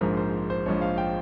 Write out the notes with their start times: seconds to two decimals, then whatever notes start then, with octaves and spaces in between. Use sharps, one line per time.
0.01 A#1 G#2 F3 A#4
0.17 C5
0.50 C5
0.66 A#1 G#2 F3 C#5
0.81 F5
0.98 G5